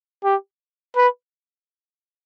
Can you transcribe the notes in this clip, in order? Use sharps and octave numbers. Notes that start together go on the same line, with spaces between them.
G4
B4